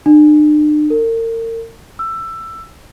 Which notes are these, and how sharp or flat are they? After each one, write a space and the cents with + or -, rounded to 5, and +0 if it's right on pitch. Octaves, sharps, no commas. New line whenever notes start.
D4 +45
A#4 -40
E6 +15